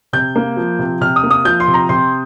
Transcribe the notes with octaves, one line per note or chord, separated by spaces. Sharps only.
C3 G6
A#3
F3
C3
C3 F6
D#6
A#3
D#6
F3 G6
C6
C3
A#5
C3 C6